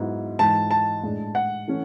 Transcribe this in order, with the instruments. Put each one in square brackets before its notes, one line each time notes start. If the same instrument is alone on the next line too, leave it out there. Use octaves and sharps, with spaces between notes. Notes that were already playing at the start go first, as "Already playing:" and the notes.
Already playing: [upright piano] G#2 F#3 B3 E4
[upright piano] G#2 E3 G#3 [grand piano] A5
[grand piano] A5
[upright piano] A2 G#3 D4 G#4
[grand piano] F#5
[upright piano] E3 A3 C#4